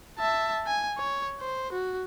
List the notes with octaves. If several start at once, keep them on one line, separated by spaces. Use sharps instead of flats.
E5 A5
G#5
C#5
C5
F#4